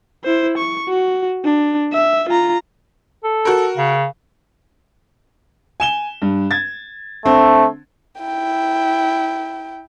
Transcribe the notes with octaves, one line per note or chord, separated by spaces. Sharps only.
E4 C5
C#6
F#4
D4
E5
F4 A#5
A4
F#4 A#4
C#3
G#5 E7 G7
G2
G#6 A6
D3 A3 C4
E4 G5